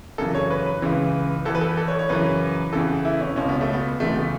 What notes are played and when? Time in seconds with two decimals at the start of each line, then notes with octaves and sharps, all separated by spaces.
0.18 F#2 C#3 E3 A4
0.35 C#5
0.51 B4
0.66 B4
0.82 C#2 C#3 E3
1.45 E2 E3 A4
1.55 B4
1.61 A4
1.77 A4
1.88 C#5
1.99 C#5
2.09 F#2 C#3 E3 B4
2.73 E2 C#3 E3 A4
3.05 E4
3.20 C#4
3.36 C#2 B2 C#4
3.49 B3
3.61 A3
3.73 B3
4.00 C#2 C#3 E3 A3
4.16 B3